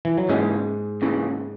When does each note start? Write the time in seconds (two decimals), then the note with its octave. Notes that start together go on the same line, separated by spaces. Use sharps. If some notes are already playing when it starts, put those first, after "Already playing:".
0.05 E3
0.18 F#3
0.29 D#2 G#2 C#3 E3 G#3
1.02 D#2 C#3 E3